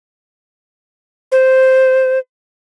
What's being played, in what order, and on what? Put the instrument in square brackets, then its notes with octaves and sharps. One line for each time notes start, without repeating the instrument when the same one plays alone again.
[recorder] C5